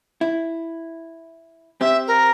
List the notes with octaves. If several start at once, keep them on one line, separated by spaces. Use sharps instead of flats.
E4
C4 G4 E5
A#4